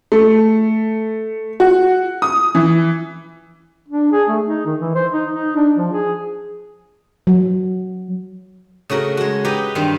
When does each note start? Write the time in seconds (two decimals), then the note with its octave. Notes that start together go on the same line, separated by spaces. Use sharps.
0.12 A3
1.60 F#4
2.22 D#6
2.55 E3
3.89 D4
4.12 G#4
4.29 A3
4.46 D#4
4.66 D#3
4.80 E3
4.95 C5
5.12 D#4
5.33 D#4
5.56 D4
5.76 F3
5.92 G#4
7.27 F#3
8.90 C#3 A3 F#4 A#4
9.17 G#3 F#4
9.44 D#4 G4 B4 D#5
9.75 G2 D#3 G3 C4 F5